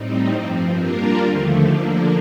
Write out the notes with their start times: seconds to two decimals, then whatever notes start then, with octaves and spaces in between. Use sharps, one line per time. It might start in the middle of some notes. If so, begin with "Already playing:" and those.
Already playing: A2 G3 C4 D#4
0.32 G2 F3 C4
0.76 G3 A#3 D4 F4 A#4
1.21 D#2 D3 F3 A3
1.66 D3 F3 A#3 D4